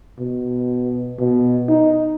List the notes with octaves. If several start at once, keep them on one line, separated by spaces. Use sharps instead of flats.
B2
B2
D#4